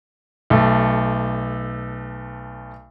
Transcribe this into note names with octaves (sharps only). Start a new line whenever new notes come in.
B1 A3